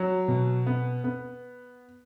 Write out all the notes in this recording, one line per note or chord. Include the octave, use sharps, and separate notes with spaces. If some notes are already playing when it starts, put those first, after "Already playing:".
Already playing: F#3
B2
B3
B3